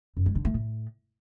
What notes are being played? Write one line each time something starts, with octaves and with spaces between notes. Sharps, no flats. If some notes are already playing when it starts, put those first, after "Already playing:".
F#2
G#3
D3
A3
A2